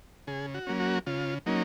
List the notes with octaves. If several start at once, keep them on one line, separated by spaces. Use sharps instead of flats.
C#3 G#4
F#4
F#3 A#3 C#4
F#4
C#3 F4
F#3 A#3 C#4 D#4